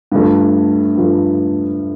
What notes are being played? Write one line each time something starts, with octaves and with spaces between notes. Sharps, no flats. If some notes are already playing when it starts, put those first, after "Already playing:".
G2 F3 A3
G2 F3 A3